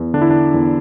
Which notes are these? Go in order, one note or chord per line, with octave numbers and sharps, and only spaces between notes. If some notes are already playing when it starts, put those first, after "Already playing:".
Already playing: E2
D3 D4
E4
D4
E2